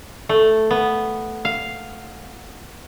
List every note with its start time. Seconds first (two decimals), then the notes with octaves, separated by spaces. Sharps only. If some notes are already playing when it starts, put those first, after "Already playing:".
0.29 A3
0.71 B3
1.45 F5